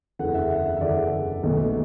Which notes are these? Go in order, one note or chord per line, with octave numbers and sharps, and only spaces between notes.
F#1 E2 D3 F#5
E5
F#5
E5
E5
F#1 E2 D3 D5
B1 B2 A3